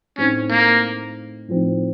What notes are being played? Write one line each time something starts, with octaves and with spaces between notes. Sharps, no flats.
A2 A3 C4 C#4 D#4
A#3
A2 F3 C4 D#4